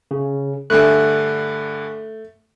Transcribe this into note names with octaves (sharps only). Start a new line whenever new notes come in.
C#3
G2 D3 A3 G#5 F#6